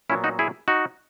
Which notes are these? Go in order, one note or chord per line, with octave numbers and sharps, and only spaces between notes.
A#2 F#3 B3 C#4 E4
D#4 F#4
E4 G#4
D#4 F#4